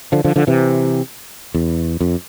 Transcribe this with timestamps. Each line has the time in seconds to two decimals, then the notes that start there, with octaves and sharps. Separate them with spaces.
0.12 D3 F3
0.25 D3 F3
0.36 D3 F3
0.47 C3 E3
1.54 E2
2.01 F2